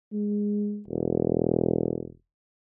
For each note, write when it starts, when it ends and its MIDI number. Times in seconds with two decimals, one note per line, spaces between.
0.13 0.81 56
0.88 2.11 28